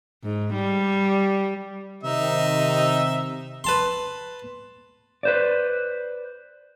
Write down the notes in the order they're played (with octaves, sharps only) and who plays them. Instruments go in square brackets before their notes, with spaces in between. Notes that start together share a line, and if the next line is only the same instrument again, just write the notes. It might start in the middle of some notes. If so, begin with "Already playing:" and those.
[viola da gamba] G#2
G3
[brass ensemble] C3 D#3 [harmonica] D#4 E5
[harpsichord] B4 A5 C6
[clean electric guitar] B4 C5 D5